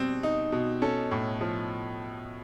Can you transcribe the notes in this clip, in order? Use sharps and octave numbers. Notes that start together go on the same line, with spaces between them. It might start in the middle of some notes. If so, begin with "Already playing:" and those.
Already playing: B2 G3 C4
D#4
B2
C#4 A4
A2
F3